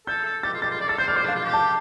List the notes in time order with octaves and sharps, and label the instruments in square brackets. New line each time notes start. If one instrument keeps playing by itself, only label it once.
[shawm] A4 [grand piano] G6
[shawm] A4
[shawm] G4 [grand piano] A6
[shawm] F4
[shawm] G4 [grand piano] A6
[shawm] F4
D5
[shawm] A4 [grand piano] A6
[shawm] C5 [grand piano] G6
[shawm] D5 [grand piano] F6
[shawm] C5 [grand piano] D6
[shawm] D4
[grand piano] F5
[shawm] F4
G4
[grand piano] A5